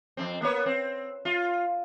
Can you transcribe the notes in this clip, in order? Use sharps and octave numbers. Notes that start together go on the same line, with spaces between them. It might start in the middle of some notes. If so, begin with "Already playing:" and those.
F2 A2 C4
A#3 B3 C#5
C4
F4